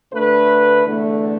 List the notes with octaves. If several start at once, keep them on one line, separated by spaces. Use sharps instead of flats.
D2 D3 A3 B4
E2 D3 A3